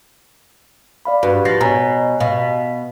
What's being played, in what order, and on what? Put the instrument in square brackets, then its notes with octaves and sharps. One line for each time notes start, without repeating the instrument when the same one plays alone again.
[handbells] D5 F5 B5
[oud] G2 [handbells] F#4 B4
[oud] F3 [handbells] A6 A#6 C7
[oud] B2 [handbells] C#5 G#5 A#5
[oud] B2 [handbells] F5